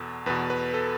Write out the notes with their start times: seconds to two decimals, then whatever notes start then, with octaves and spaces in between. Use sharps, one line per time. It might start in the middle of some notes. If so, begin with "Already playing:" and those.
Already playing: E2 B2 A4
0.26 E2 B2 B4
0.50 B4
0.74 A4